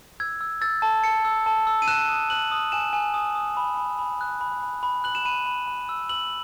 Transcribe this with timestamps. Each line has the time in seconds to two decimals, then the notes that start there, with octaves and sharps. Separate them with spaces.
0.20 E6 G#6
0.41 E6
0.61 E6 A6
0.82 A5
1.04 A5 C#7
1.25 E6
1.46 A5
1.67 E6
1.82 D#7
1.88 F#6 E7
2.09 D#6
2.30 F#6 F#7
2.52 D#6
2.72 G#5 E7
2.93 G#5
3.14 D#6
3.35 D#6
3.57 B5
3.77 B5
3.99 B5
4.21 F#6
4.41 B5
4.63 B5
4.83 B5
5.04 F#6 F#7
5.15 E7
5.25 B5 D#7
5.46 B5
5.67 B5
5.89 E6
6.09 E6 F#7